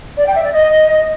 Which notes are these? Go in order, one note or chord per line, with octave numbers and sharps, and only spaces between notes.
D5
G5
E5
D5
D#5